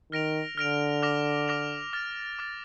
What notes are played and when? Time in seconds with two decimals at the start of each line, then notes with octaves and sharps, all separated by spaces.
0.12 D#3 F6 A#6 D7 F7
0.57 D3 F6 A#6 D7 F7
1.03 D6 F6 A#6 F7
1.48 D6 F6 A#6 F7
1.93 D6 F6 A6
2.39 D6 F6 A6